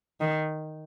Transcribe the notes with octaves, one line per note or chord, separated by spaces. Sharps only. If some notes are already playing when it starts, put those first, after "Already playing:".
D#3